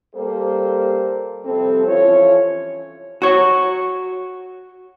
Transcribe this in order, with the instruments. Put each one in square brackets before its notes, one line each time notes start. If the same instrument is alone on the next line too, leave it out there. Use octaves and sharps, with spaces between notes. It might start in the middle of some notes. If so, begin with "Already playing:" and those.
[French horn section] G3 A#3 G4 A4 C5
C3 F3 G3 C4 A4
E3 F3 C#4 F4 C#5
[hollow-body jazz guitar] F#4 C#5